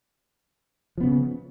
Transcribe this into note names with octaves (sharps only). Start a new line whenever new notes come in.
C#3 F3 B3